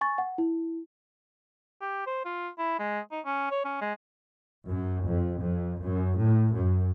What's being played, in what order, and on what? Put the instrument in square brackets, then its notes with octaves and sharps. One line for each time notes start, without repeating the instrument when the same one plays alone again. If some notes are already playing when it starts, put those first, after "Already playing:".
[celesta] G#5 C#6 A6
F#5
E4
[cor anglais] G4
C5
F4
E4
G#3
D#4
C#4
C#5
C#4
G#3
[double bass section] F#2
F2
F2
F#2
A2
F#2